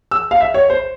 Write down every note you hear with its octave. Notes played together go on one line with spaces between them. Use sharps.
E6
F5
E5
C#5
C5